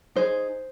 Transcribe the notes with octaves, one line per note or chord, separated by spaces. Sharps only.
D#4 G#4 C5